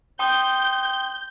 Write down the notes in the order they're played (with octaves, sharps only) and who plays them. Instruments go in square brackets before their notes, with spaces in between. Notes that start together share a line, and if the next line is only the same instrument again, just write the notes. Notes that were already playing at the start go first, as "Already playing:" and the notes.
[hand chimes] G5 C6 D#6 [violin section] G6